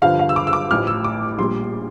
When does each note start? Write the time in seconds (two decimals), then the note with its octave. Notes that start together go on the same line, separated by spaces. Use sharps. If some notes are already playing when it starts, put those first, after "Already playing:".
0.02 G1 G2 D3 F3 F5
0.19 F5
0.29 E6
0.36 D6
0.47 E6
0.53 D6
0.71 A1 A2 F3 F6
0.87 E6
1.04 D6
1.38 A#1 A#2 G3 C6